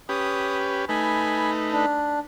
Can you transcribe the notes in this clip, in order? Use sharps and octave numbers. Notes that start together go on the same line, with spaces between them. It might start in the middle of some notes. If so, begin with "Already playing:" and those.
C#4 G4 B4 D#6
A3 D#4 B4 G#5 B5
D4